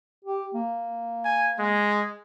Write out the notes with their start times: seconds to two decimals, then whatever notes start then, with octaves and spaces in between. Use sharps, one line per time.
0.25 G4
0.54 A#3
1.25 G#5
1.59 G#3